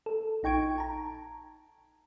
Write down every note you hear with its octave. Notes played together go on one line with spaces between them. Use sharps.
A4
A#1 D#4 G5 C#6 G#6 D7
A5 A#5